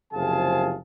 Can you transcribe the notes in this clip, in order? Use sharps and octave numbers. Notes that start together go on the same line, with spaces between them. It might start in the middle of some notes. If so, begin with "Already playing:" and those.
F#1 C3 F3 G#4 F5 A5